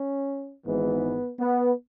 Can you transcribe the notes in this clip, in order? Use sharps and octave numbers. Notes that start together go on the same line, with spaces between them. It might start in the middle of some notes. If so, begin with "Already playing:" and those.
Already playing: C#4
G#1 G#2 E3 B3
B3